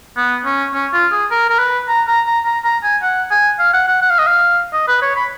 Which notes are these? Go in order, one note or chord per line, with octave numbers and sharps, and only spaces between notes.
B3
C#4
C#4
F4
G#4
A#4
A#4
B4
A#5
A#5
A#5
A#5
A#5
G#5
F#5
G#5
F5
F#5
F#5
F#5
F5
D#5
F5
D#5
B4
C#5
B5